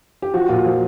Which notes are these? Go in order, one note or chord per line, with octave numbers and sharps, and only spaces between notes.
G4
F3 F#4
A#2 F4
F3